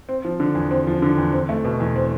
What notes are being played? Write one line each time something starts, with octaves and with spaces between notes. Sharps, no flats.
C4
F3
D3
E2
C4
F3
D3
E2
C4
A3
B2
E2
C4